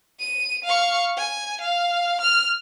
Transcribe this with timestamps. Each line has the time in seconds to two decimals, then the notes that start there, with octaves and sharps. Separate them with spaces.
0.20 D#7
0.64 F5 C#6
1.17 G#5
1.61 F5
2.21 F6